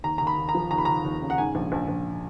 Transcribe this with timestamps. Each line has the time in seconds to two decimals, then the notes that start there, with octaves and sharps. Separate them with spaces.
0.04 D#2 A#5
0.18 D#2 A#5
0.27 B5
0.38 D#2
0.49 A#5
0.55 F3
0.71 D#2 A#5
0.78 B5
0.85 D#2 A#5
1.04 D#2
1.22 C#3
1.30 F#5
1.38 G#2 G#5
1.55 A#1
1.72 A#1
1.88 A#1